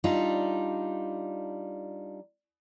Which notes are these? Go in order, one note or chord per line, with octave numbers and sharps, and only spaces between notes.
G3 D4 D#4 F4